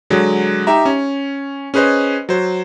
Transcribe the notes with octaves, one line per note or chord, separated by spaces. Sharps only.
D3 F#3 G#3
D#4 G4 E5 A#5
C#4
C#4 G#4 B4 C5 D#5
F#3 C5